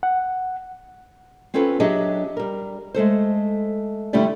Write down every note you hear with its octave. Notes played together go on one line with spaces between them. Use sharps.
F#5
C4 C#4 F4 A4 B4
F#3 D4 G4 G#4 D#5 E5
G3 A#4
G#3 A3 A4 C5
D3 G3 A3 E4 G4 D5